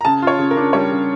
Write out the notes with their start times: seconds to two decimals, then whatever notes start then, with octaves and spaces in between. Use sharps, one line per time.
0.01 A#5
0.05 C#3 A5
0.22 F4 C#5
0.39 C#3
0.51 A#4
0.57 D4
0.73 G3 C#5
0.91 C#3